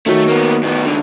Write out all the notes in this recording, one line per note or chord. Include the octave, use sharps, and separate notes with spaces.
D#3 F#3 A3
A#3 B3
A2 B3
C#2 D3